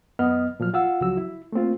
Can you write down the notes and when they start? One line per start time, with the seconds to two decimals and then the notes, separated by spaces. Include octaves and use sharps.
0.19 F#2 B3 D#5 F6
0.60 A#2 F3 F#3 F6
0.74 F4 F5 F#5 E6
1.01 C#2 C#3 F3 F#3 F#4 E6
1.17 E4
1.52 A3 A#3 C4 F4